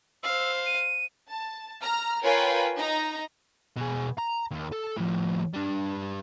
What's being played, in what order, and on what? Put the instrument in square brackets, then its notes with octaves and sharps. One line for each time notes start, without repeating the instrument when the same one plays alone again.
[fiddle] C5 F5 [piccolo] E6
[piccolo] D#7
[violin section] A5
A#5 F6
F4 A#4 B4 C#5 G5 G#5
D#4 A#5
[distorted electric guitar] B2 G#4
A#5
D#2
A4
A2 F3
G3 D4